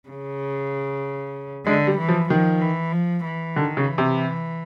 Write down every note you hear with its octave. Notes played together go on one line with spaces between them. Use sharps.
C#3
D3 G#3
G3
E3
F3
D#3 F3
E3
F3
E3
D3 D#3
C#3
E3
C3